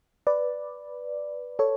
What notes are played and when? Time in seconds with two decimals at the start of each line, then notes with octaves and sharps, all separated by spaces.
0.27 B4 D5
1.59 A4 C#5